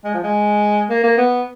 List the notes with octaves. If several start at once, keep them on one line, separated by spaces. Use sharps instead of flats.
G#3
F3
G#3
A#3
A#3
B3